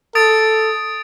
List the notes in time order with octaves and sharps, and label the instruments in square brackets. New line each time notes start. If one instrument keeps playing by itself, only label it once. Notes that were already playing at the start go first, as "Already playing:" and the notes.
[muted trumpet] A4 [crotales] D#6 A6 D7